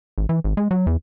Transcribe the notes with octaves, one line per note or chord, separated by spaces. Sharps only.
G#1
E3
G#1
G#3
F#3
E2